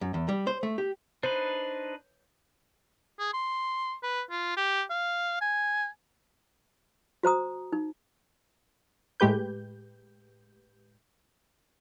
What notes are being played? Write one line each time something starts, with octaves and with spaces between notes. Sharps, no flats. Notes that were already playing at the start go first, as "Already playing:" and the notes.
F#2
E2
G3
C5
A3
G4
D4 D#4 B4 C5
G#4
C6
B4
F4
G4
F5
G#5
F#4 C5 A#5 D#6
D#4
A2 G#3 G4 B4 G6